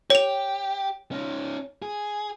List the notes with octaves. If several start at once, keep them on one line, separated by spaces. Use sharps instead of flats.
G4 C#5 F7
C#4 D#4
G#4